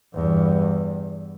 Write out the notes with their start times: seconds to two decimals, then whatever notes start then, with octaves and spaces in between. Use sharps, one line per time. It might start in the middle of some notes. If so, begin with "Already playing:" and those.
0.15 E2 G2